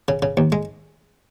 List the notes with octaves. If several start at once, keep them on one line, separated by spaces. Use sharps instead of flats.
C#3
C#3
D#2
G#3